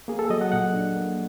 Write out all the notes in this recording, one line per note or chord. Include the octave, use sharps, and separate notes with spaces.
A#3 G#4
A4
F#3 D#5
F#5
A#2 F#5
D4
A#3